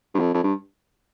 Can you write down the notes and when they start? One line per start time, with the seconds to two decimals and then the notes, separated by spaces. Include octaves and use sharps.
0.14 G2
0.19 F2
0.34 F2
0.43 G2